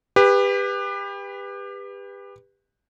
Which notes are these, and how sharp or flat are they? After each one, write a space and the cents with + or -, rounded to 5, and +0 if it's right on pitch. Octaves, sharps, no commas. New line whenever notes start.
G4 +30 B4 +0